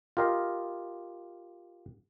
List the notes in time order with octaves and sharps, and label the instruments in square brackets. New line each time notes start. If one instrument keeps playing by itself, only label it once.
[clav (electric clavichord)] F4 G4 A#4 D#5 F5